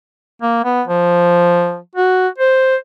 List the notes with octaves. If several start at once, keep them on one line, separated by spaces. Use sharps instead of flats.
A#3
B3
F3
F#4
C5